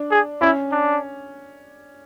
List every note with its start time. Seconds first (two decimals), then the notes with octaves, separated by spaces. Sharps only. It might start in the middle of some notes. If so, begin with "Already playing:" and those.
Already playing: D4
0.11 G#4
0.41 C#4 E4
0.72 D4